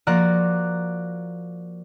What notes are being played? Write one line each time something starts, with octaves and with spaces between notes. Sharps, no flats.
F3 A#3 F#4 D5 A#5 F#6